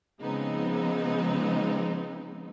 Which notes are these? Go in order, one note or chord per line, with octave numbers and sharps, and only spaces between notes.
C#3 F3 G#3 B3 C4 D#4